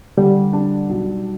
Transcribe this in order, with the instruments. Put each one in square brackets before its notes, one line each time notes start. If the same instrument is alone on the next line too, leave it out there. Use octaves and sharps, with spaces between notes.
[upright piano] D3 [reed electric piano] G3
[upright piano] D4
B1